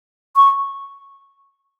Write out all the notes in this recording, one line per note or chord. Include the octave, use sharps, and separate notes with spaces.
C#6